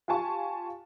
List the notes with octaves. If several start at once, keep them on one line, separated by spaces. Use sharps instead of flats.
F4 G4 G#5 A5 C#6